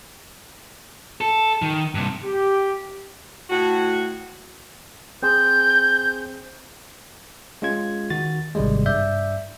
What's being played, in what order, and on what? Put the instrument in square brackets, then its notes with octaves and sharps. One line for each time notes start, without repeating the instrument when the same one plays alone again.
[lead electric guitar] A4
D#3
G2 C3
[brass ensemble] G4
[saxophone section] A2 F#4
[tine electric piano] C4 G#4 C5 [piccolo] G6
[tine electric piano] G#3 C#4 F4 G#6
D#3 F#4 A6
G#1 C3 D#3 G3 G#3
G2 D5 E5 G6